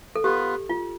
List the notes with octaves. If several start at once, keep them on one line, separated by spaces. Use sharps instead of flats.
A4
B3 F4 G4 B4
F4